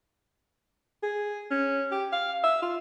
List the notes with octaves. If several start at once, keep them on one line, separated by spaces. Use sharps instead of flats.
G#4
C#4
G4
F5
E5
F4